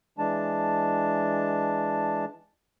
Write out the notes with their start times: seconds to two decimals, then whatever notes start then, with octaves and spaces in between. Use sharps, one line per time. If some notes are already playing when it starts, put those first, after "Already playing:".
0.18 E3 G#3 D4 A5